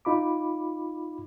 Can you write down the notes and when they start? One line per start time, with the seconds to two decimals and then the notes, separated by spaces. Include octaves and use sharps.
0.05 D#4 F4 B5 D6